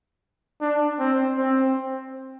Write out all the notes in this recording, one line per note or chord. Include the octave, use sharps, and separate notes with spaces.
D4
C4
C4